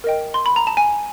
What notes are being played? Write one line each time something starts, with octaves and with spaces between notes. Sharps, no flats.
A#4 D#5 G5
C6
B5
A#5
A5
G#5